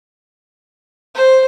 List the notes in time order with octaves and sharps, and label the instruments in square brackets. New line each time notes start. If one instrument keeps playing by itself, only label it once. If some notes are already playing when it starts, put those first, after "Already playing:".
[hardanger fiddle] C5